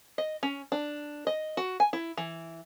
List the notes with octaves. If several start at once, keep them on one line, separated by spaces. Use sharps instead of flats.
D#5
C#4
D4
D#5
F#4
G#5
E4
E3